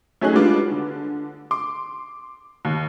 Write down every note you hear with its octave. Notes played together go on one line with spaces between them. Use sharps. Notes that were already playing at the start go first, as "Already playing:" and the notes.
F#3 A3 C#4 D#4 G#4 F#6
G3 G#3 B3 D4 F4
D3
C6 D6
D#2